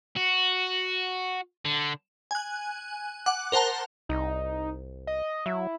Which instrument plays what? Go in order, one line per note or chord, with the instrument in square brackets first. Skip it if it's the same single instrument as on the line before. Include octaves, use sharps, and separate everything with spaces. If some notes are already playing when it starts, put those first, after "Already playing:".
[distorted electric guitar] F#4
D3
[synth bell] G#5 F#6
F#5 D6 F#6
A#4 C5 F#5 A5 A#5
[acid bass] C2 [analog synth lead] D#4
[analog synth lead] D#5
[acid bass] F#3 [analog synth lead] E4